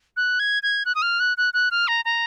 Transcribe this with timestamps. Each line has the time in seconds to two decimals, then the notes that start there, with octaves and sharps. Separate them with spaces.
0.17 F#6
0.40 G#6
0.63 G#6
0.85 F#6
0.95 D#6
1.02 F6
1.20 F#6
1.37 F#6
1.54 F#6
1.71 F6
1.88 A#5
2.05 A#5